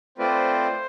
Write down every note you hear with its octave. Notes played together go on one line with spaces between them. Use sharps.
A3 C4 F4 B4 C5 D5